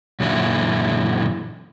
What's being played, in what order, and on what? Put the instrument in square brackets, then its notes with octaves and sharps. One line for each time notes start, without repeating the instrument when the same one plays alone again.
[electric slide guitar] F#2 A#2 D3 E3 E4